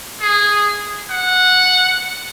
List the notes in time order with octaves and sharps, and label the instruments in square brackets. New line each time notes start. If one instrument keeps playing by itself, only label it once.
[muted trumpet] G#4
F#5